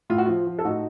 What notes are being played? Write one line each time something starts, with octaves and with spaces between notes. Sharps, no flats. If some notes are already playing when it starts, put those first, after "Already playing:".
A2 F4
F#4
F3 F4
F3
A4
A2 D#4 F#4